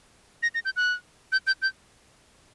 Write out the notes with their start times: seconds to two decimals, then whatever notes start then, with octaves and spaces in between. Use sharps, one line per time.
0.43 A#6
0.54 A#6
0.65 G6
0.76 F#6
1.32 G6
1.47 G6
1.62 G6